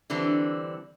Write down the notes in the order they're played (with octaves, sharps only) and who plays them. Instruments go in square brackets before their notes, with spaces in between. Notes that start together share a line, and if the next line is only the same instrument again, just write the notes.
[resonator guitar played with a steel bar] D3 E3 G3 C4 D4